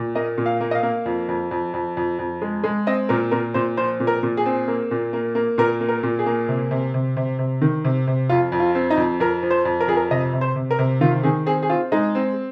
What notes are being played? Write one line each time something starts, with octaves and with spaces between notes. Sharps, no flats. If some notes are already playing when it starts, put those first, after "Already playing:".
Already playing: A#2
A#3 D#5
A#2
F5
A#3
D#5
F5
A#3
F2
F2
F2
F2
F2
F2
G#3
G#3
C4 D#5
A#2 A#4
A#2 A#4
A#2 C5
F3 C5
A#2
A#4
A#2
G#4
C4
A#3
A#2
A#3
A#3
A#2 A#4
A#3
A#4
A#2
G#4
A#3
C3
C3
C3
C3
C3
D#3
C3
C3
F2 F4
F2
F4
C4
D#4
F2
F2 A#4
F3
C5
F2
A#4
F2 G#4
A#4
C3 D#5
C3
C5
C3
A#4
C3
D#3 F4
D#3 G#4
C4 G#4
G#4
C4 F4
G#3 D#4
C4